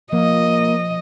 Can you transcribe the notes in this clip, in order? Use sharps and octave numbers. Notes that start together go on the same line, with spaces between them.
F3 A#3 D#5